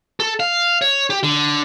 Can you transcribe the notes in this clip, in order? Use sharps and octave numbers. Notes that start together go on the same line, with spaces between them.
A4
F5
C#5
G4
D3